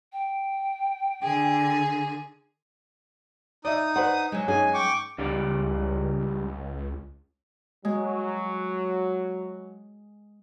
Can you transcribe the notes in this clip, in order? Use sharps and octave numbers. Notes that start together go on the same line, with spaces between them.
G5
D3 G#4
D#4 D5 E5 D#6
B4 C5 D5 F#5
F#3 G#3
G#2 C#4 G#4 G#5
G5 C#6 D6
C#2 C#3 G3 D5
F#3 G#3